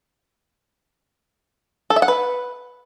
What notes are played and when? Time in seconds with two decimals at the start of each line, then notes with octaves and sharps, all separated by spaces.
1.90 A4
1.96 E5
2.02 F#5
2.08 B4